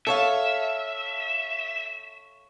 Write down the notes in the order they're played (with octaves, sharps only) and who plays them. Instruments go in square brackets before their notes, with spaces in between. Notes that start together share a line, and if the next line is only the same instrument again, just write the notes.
[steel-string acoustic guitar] A4 C#5 F5 [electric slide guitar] E5